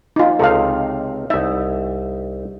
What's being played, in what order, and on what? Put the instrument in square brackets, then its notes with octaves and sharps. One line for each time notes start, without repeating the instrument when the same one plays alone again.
[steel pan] D#4 F4
[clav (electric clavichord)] C#2 C3 D#4 [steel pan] A4 F5
[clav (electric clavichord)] C2 D#4 [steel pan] E5